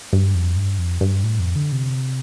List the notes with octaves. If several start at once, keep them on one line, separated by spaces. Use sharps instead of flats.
G2
F2
G2
F2
G2
A2
F2
D3
C3